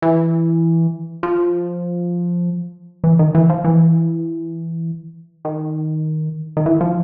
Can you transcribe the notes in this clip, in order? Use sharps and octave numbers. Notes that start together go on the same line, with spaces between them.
E3
F3
E3
D#3
E3
F3
E3
D#3
D#3
E3
F3